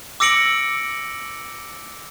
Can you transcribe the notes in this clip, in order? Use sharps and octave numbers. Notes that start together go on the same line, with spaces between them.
D6 E6 A#6 C#7 D7 F#7